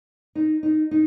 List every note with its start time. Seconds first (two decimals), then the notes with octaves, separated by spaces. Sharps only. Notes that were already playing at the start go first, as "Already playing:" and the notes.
0.35 D#4
0.63 D#4
0.91 D#4